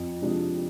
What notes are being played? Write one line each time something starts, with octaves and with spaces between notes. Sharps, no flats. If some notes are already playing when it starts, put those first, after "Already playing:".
Already playing: F2
C3 F3 G#3 D4